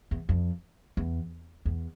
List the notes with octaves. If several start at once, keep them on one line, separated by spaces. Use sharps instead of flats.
E2
F2
E2
E2